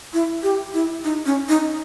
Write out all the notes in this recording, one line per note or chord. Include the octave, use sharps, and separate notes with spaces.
E4
G4
E4
D#4
C#4
D#4